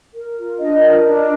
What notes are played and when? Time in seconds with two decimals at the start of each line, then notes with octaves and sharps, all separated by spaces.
0.14 A#4
0.37 F4
0.59 D4 D#5
0.82 A#4
1.04 D4